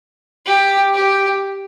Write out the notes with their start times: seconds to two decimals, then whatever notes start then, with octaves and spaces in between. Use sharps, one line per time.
0.46 G4
0.94 G4